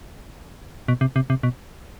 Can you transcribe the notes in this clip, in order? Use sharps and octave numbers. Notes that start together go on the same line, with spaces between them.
B2
C3
C3
C3
B2